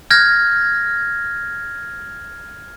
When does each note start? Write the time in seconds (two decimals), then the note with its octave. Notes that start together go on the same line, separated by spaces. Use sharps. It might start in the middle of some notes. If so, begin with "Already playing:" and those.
0.11 F6 G6 G#6 A#6